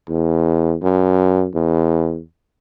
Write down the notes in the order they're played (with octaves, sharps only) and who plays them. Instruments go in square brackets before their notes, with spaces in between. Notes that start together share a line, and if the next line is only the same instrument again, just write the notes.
[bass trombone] E2
F#2
E2